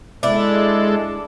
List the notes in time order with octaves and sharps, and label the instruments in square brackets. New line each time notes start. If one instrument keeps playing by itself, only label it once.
[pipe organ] G#3 A4 [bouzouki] D4 E4